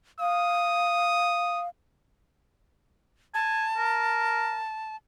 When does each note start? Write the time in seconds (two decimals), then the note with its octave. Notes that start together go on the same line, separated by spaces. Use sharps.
0.20 F5 D#6
3.34 G#5 A5
3.76 A#4